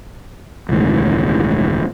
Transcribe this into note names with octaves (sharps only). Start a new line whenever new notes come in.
E1 C#2 A2 D#3